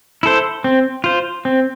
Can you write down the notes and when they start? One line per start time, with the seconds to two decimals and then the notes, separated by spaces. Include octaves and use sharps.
0.23 E4 A4 C5
0.64 C4
1.04 F4 C5
1.45 C4